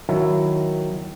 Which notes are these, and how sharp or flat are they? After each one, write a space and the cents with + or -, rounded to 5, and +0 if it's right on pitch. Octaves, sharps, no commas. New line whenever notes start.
D#3 +0 F#3 +0 E4 +5